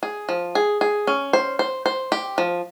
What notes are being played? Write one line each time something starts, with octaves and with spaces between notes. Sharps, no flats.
G#4
F3
G#4
G#4
C#4
C5
C5
C5
G4
F3